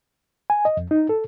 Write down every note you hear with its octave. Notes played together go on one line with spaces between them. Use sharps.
G#5
D#5
F2
D#4
A4